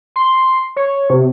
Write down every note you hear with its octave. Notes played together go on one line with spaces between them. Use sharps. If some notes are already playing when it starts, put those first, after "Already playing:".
C6
C#5
C3